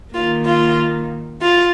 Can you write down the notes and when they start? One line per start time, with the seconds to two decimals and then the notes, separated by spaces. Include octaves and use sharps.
0.14 D#3 A#3 F4
0.46 F4
1.42 F4